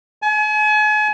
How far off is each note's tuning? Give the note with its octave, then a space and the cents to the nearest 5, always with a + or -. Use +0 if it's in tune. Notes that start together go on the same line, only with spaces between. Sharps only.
G#5 +40